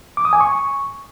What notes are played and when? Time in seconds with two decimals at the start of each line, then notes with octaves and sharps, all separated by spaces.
0.17 D6
0.25 D#6
0.33 G#5
0.41 C#6